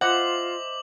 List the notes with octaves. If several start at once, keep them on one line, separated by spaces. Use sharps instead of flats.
F4 C5 D#5 E5 F#5 D6 F#7